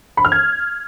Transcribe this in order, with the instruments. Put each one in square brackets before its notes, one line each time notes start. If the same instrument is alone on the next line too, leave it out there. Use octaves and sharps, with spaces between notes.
[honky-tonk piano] B5
F6
G#6